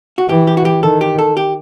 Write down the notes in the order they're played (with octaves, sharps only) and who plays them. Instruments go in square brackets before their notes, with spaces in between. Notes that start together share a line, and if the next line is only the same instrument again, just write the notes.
[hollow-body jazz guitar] F#4
[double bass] E3 [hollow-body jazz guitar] G4
[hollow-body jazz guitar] G4
F#4
G4
[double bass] D#3 [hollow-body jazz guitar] A4
[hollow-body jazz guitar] G4
A4
G4